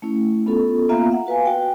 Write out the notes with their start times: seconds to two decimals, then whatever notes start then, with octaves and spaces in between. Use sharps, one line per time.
0.02 A3 C#4 E4
0.46 B3 C#4 F4 A4
0.89 A#3 B3 F4 E5 F5 A#5
1.11 E5 F#5
1.27 F#4 B4 F5 G#5
1.46 F#4 G5